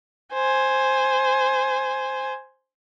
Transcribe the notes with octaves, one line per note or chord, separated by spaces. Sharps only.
C5 G#5